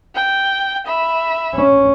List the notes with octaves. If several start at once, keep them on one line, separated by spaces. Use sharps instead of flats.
G5
E5 B5
C#4